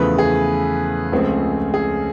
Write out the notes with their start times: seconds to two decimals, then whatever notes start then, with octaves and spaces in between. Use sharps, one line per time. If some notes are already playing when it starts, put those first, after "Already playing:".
Already playing: E2 C#3 F3 A3 B4
0.18 G#4
1.12 C#2 C#3 F3 A3 C4
1.74 G#4